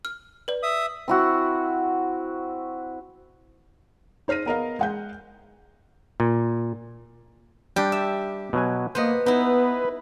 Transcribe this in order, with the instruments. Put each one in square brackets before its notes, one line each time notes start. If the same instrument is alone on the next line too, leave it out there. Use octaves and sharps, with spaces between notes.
[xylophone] F6
B4 D5
[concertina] E5 D#6
[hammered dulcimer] C4 E4 F#4
[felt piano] D#4 C5 F6 A#6 D#7
B3 A#4 D#5 F5
G#3 F#5 G6
[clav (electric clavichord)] A#2
[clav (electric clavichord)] G3 D4 [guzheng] G4
[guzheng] E5
[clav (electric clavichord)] B2 F#3 G#5
[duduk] A#3 [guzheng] B3 B4 [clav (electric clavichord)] C5 D#5
[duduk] B3 [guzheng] D#4 E4 [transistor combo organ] B4